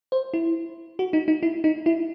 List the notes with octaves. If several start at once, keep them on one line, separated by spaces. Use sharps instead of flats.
C5
E4
F#4
D#4
D#4
E4
D#4
E4